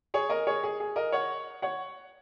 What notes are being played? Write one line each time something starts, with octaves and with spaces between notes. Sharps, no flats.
G#4 C#5
A#4 D#5
G#4 C#5
G#4
G#4
A#4 D#5
C#5 F#5
C#5 F#5